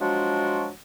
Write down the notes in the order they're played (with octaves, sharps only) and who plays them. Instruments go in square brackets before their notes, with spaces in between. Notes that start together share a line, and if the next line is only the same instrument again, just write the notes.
[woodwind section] F3 F#3 G#3 D4 F4 F#4